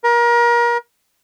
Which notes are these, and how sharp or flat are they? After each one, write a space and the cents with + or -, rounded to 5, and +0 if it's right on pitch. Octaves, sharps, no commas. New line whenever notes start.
A#4 +30